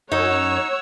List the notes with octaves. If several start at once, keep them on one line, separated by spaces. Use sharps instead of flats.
F#2 D#4 C#5 F#5 E6